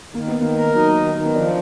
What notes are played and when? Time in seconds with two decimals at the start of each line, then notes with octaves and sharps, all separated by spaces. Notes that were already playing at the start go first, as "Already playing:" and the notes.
0.14 D#3 A#3
0.28 B3
0.35 D#3
0.41 A#3
0.55 A#4
0.75 F#3 D#4
0.95 D#3
1.15 D#3
1.24 B3
1.35 F3 D4